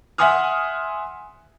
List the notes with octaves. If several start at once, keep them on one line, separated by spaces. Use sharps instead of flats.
E5 F#5 G#5 C6 D#6 F6